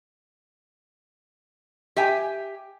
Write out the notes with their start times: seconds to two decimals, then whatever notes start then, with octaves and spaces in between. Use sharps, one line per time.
1.96 G4 E5 G5 G#5